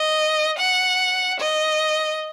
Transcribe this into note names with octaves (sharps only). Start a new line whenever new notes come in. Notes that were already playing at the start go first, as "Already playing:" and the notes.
Already playing: D#5
F#5
D#5